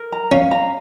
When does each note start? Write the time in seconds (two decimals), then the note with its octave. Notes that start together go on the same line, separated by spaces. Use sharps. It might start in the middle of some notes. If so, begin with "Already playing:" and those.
Already playing: A#4
0.12 A#5
0.32 C#4 F5
0.51 A#5